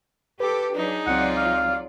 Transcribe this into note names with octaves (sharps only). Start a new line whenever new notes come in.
G4 A4 B4 D6
F#3 D4 D#4 G#4
C#2 F#3 C4 F4 D5 F#5
F5